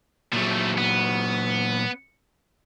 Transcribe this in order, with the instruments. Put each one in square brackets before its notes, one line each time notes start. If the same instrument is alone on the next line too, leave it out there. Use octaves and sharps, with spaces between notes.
[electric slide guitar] A#2 F#3 [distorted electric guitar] F3 A3
[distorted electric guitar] B3